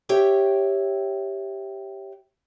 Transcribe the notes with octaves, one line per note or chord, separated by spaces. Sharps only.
G4 C#5 E5 G5